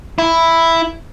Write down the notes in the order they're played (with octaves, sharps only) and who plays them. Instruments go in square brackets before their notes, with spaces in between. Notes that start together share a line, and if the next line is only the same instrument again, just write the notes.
[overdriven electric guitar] E4